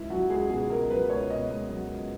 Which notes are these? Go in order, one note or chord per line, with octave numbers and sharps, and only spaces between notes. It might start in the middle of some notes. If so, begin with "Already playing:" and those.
Already playing: C#2 E4
F#3 F#4
C#2 G#4
B2 G#4
C#2 A#4
F#3 B4
C#2 C#5
B2 D#5
C#2
F#3
C#2